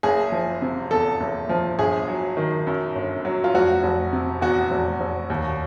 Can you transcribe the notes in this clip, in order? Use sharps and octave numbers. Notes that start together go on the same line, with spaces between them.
F#1 G#4
F3
C3
E2 A4
F#1
F3
G1 G#4
F#3
D#3
F#2
G1
F#3
F4
F1 F#4
F1
C3
E2 F#4
F1
F1
D#2